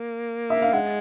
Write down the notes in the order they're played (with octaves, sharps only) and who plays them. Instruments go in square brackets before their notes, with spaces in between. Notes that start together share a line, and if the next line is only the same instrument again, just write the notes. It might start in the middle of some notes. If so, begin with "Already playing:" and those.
Already playing: [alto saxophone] A#3
[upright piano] E5
F5
[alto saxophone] G#3 [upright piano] F#5